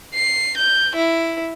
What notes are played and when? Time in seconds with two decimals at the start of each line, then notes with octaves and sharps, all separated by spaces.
0.14 C7
0.57 G6
0.96 E4